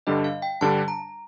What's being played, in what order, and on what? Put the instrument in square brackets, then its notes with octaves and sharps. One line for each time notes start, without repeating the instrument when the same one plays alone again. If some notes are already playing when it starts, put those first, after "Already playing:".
[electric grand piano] G2 D3 G3 D4 [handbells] D#5
[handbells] F5
G5
[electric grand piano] G2 D3 G3 D4 [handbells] A5
[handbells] A#5